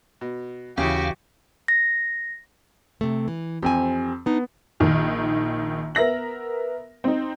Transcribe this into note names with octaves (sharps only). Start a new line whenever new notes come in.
B2
D#2 C#3 E3 E4 F#4 G4 F5
A#6
C3 A3
E3
F2 C4 G4 G#5
B3 D4 D#4
A#1 D#3
B3 A#4 E5 A#6 F#7
C4 D#4